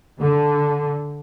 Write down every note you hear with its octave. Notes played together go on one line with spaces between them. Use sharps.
D3